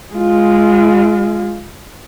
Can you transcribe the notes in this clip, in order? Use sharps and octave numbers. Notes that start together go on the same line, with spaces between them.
G#3 F4